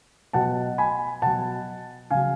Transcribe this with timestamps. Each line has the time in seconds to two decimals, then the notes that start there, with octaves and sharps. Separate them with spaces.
0.33 B2 F#3 F#5 A5
0.78 G#5 B5
1.22 B2 F#3 F#5 A5
2.11 C#3 F#3 F5 G#5